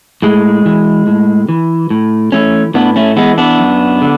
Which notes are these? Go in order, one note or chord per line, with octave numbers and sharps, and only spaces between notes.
A2 G#3
E3
A2
E3
A2
E3 A3 C#4
A2 B3 D4
A3 C#4
E3 G#3 B3
B3 D4
F#2
D3